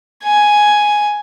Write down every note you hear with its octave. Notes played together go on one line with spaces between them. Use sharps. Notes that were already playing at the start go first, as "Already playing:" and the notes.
G#5